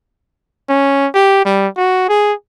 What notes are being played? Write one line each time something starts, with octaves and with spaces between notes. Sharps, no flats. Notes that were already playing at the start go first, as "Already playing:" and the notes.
C#4
G4
G3
F#4
G#4